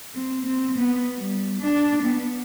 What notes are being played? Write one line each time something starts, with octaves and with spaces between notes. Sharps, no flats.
C4
C4
B3
G3
D4
B3